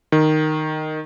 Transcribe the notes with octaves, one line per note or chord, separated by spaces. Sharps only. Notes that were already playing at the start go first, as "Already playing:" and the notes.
D#3